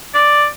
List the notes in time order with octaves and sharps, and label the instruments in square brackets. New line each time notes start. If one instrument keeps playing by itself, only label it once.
[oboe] D5